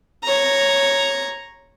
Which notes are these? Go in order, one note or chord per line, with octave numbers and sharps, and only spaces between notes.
C#5 A#5